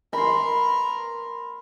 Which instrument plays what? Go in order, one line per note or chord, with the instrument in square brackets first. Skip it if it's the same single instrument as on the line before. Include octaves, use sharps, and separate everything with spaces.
[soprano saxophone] A#4 [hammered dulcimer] B5 C6